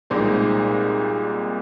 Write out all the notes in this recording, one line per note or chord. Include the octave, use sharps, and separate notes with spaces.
C2 A#2 G#3 C4 D#4